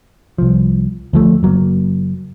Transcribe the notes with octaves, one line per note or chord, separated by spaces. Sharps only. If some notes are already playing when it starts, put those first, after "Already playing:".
C2 F3
D2 F3 A3
F#1 F#3 A#3